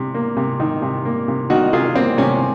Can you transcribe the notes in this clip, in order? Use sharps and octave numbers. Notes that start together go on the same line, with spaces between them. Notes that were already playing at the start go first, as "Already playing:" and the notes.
Already playing: C3
A#3
C3
D#3
C3
A#3
C3
D#3 D#4 F#4
C3 F4 G#4
A#3 C4
C3 C#4